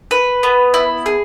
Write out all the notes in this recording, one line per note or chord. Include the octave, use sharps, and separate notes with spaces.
B4
B3
E4
G#4